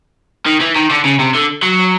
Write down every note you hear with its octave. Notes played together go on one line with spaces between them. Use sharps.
D#3
E3
D#3
D3
C#3
C3
D3
F#3